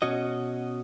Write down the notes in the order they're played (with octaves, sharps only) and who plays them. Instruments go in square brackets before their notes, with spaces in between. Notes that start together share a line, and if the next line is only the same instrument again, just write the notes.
[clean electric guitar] B2 C#4 F#4 D#5